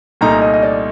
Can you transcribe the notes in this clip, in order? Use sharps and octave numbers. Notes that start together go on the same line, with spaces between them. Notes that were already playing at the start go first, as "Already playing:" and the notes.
C2 A#2 A3 D#4 A#5
D#5
D#5
D5